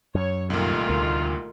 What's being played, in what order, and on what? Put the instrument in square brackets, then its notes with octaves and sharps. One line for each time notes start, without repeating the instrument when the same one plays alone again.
[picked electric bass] F#2 [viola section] C#5
[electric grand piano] C2 A#2 [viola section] D#3 A3 F4
[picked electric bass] D2